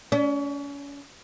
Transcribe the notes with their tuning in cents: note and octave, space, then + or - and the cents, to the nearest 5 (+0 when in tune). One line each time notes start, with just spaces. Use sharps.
C#4 +35